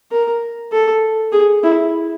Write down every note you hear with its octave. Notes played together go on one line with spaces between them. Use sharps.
A#4
A4
G#4
E4